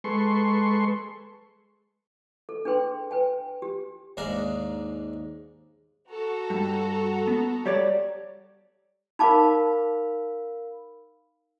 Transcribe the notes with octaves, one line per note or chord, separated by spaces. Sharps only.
G#3 A4 B4 C6 C#6
A4
D4 G#4 B4 G5 C6
B4 G5 G#5
G4
D#2 G#2 D4 G#4 F5 A#5
F#4 A4 A#5
G2
B3
G3 C#5 D5
D#4 A#4 F5 A5 B5 D6